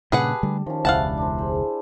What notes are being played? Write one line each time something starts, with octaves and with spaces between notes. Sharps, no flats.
G2 A#2 C#3 G4 G#4 B4 F#5 A5
D3 G3 A3
D#3 F3 C#4
E1 C#2 C#4 D4 E4 F5 F#5 A5
D4 A#4 C5
G#4 C5 B5